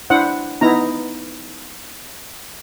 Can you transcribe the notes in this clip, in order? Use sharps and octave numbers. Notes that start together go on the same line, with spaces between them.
D4 E4 C5 F#5
B3 D#4 E4 A#5